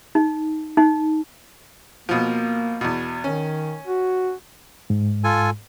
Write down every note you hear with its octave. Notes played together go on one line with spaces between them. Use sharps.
D#4
D#4
B2 F3 A#3
E2 B2
D#3 C#4
F#4
G#2
F4 A4 G#5